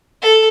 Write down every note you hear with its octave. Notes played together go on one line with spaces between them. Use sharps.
A4